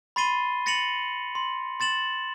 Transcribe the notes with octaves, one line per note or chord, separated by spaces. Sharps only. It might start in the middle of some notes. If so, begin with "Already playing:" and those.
B5 C6 A6 C7 D#7 G7
A6 A#6 C#7 D#7 F7 F#7
C6
C6 A6 E7 F#7